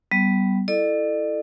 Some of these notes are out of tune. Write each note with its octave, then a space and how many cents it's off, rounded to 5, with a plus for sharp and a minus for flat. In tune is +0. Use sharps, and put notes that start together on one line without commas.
G3 -20 B3 +0
E4 +0 A4 +0 D5 +45